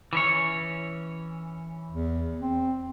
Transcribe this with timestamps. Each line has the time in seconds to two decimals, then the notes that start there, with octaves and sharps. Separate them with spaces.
0.13 E3 C#4 C#5
1.91 E2
2.40 C4